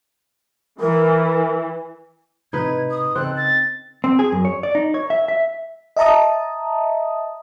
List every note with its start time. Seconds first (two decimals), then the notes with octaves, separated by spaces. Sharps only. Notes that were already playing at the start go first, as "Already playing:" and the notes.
0.80 E3 A#4
2.53 A2 C3 D#4 B4 G#6
2.90 D#6
3.15 C#3 C4 A4 D#5 F#6
3.37 A6
4.04 C4
4.19 G#4
4.32 F#2
4.45 C#5
4.63 D5
4.75 D#4
4.94 C#5
5.10 E5
5.28 E5
5.97 D#5 E5 A5 A#5 D#6